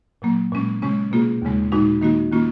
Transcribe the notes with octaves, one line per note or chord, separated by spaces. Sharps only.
A#2 F#3 A#3
A#2 G#3 C#4
C#3 G#3 C#4
B2 A#3 F4 G#4
D#2 C#3 G#3
A#2 G#3 D#4 F#4
D#3 A#3 D#4 F#4
D#3 A#3 C#4 F4